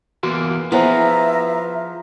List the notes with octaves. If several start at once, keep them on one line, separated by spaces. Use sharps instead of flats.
E2 E3 A#3 F#4
F3 B3 E4 G#4 C5 E5 A#5